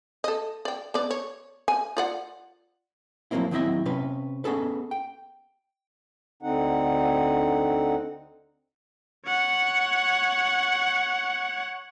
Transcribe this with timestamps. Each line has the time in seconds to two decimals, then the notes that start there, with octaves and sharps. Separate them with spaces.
0.24 A4 D#5
0.65 D5 G5
0.94 B3 D5
1.11 C#5
1.68 G#5
1.97 F4 D5 F#5
3.31 F3 F#3 A3 A#3 C4 E4
3.51 D#2 F#3 C4 E4 D#5 E5
3.86 C3 C#4 B4
4.44 B3 C#4 G#4 A4 B4
4.91 G5
6.43 D2 D3 C4 D#4 F#5
9.26 C#5 F#5